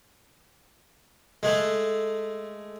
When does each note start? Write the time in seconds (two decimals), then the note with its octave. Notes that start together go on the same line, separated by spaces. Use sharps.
1.43 G#3 A3